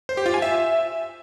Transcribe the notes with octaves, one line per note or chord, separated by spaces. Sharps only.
C5
G4
F4
G#5
E5